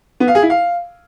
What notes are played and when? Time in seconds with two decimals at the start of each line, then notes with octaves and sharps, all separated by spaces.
0.20 B3
0.28 F5
0.35 G#4
0.42 E4
0.50 F5